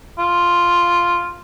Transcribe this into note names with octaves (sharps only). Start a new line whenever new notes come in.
F4